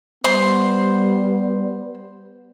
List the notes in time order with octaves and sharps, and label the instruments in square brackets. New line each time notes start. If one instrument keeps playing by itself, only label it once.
[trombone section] G3 B3 [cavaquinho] C5 C6